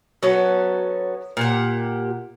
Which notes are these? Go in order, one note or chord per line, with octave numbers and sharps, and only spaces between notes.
F#3 B3 C#4 A4
A#2 G4 F#5